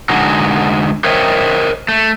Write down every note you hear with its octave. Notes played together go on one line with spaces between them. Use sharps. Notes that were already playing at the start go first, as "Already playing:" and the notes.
D3 G#3 D#4 F#4
A#4 C5 C#5 D#5 E5 G5
A3